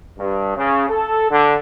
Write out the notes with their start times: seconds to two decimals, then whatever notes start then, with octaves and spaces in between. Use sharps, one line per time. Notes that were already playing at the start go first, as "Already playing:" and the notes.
0.18 G2
0.57 C#3
0.90 A4
1.30 D3